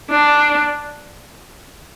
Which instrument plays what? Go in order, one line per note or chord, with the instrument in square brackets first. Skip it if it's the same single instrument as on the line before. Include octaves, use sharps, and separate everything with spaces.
[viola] D4